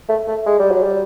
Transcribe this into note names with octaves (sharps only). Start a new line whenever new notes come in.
A3
A3
G#3
G3
F#3
G3